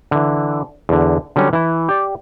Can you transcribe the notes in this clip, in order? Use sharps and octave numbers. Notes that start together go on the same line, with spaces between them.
D3 E3
E2 D3
D3 F#3 G3 C#4
E3 E4
G4 D5